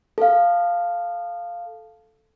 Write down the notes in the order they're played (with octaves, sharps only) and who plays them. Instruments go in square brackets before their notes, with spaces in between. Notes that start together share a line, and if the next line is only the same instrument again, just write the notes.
[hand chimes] A4 F5